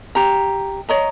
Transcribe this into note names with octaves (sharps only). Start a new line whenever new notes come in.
G4 A#5
C#5 D#5 A#5